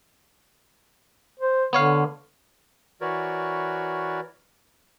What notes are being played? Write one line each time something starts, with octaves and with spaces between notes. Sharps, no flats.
C5
D3 B3 C#5 F5
E3 F#4 A#4 B4 C#5 D5